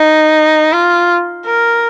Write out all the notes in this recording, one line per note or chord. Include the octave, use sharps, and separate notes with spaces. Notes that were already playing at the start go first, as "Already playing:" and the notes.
Already playing: D#4
F4
A#4